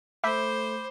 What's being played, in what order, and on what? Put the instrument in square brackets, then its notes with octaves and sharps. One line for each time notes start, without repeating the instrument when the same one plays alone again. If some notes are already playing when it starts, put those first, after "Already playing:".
[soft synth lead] A3 [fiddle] C5 [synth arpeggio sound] E5 [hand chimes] B5 D6 G6